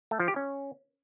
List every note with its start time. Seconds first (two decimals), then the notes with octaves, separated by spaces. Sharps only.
0.11 A3
0.20 F3
0.28 G4
0.36 C#4